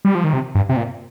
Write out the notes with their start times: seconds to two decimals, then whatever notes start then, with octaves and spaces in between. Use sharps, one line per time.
0.05 G3
0.15 F3
0.24 D#3
0.33 C3
0.55 G2
0.69 C3
0.77 A#2